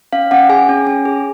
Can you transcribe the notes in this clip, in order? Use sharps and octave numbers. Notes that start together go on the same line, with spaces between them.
C#4 F5
C#4 F#5
G#4 G#5
C#4
C#4
G#4